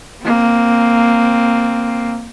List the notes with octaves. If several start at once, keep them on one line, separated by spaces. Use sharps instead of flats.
A#3 C4